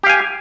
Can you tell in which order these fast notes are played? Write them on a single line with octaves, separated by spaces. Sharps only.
G4 F5 G#5